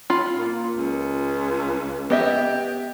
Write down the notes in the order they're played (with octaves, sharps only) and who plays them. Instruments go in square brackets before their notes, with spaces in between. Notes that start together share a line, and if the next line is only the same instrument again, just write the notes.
[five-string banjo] F4 B5
[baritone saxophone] A#2
C#2
[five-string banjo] B3 D#5 E5 [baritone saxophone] G4